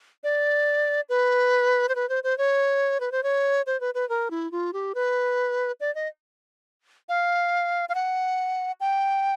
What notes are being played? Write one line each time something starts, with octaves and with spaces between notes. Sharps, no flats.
D5
B4
C5
B4
C5
C5
C#5
B4
C5
C#5
C5
B4
B4
A#4
E4
F4
G4
B4
D5
D#5
F5
F5
F#5
G5